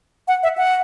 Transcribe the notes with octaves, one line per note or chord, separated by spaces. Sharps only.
F#5
E5
F#5